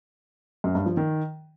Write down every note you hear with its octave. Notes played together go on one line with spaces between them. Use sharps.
F#2
G2
F3
D#3